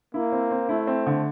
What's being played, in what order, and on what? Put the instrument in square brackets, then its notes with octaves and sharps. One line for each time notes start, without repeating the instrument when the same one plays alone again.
[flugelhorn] A#3 [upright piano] E4
[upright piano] C4
C4
[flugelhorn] A3 [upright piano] E4
[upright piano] C4
D3